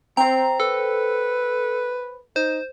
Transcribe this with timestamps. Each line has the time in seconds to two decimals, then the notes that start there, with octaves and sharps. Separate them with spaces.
0.17 C4 C5 G5 A#5
0.60 A4 B4
2.36 D#4 C5